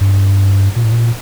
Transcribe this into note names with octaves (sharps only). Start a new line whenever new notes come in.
G2
A#2
A2
A#2